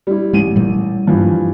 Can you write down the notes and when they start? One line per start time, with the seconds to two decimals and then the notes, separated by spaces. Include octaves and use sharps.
0.07 G3 E4
0.33 A1 G#3 D#7
0.56 A#2 G3
1.07 G2 E3 F3